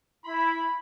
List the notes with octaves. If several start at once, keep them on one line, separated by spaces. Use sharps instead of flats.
E4 B5